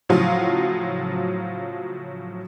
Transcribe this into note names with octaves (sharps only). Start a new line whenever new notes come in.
A2 C#3 F3 F#3 F4